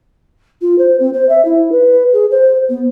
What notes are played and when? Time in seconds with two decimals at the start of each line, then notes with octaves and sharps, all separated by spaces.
0.62 F4
0.79 C5
1.00 C4
1.14 C5
1.29 E5
1.45 E4
1.72 B4
2.13 G#4
2.31 C5
2.69 B3